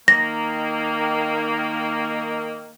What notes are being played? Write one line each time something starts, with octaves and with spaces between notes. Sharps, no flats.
D#3 A#3 A#6